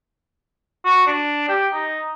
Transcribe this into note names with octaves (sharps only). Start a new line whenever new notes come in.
F#4
D4
G4
D#4